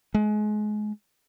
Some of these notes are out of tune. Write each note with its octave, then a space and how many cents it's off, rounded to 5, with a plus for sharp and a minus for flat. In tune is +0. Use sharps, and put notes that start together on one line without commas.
G#3 +30